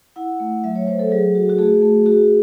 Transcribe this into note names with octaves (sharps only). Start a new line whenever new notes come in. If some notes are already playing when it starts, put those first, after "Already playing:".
E4 F#5
A3
F#3 E5
C#5
F#3 C5
A4
F#3 G#4
F#4
F#4
A3 G#4
A3
F#4 G#4